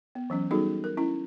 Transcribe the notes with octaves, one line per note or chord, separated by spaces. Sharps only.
B3
E3 F#3 C#4
G3 B3 D#4 F#4 G#4 A4
A#4
C#4 E4